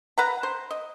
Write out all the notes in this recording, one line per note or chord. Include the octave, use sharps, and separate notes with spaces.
B4 F#5 A#5
C5
D#5